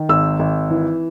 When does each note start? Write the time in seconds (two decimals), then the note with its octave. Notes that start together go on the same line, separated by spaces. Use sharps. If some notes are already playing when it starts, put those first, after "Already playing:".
Already playing: D#3
0.09 G#1 E6
0.39 G#1
0.70 E3